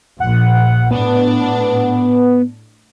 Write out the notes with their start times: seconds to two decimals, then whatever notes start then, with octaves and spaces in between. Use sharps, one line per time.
0.20 A#1 F#5
0.91 A2 B3 D4